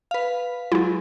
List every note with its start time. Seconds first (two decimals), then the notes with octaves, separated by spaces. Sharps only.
0.11 B4 F5
0.72 F#3 G#3 E4 F4